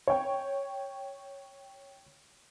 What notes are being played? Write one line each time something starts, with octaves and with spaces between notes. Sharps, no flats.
C#5 G5